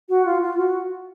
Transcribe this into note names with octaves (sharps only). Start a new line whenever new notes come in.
F#4
F4
F4
F#4